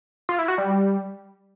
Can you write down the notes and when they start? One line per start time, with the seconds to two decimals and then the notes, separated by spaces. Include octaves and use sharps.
0.29 F4
0.39 E4
0.48 F#4
0.58 G3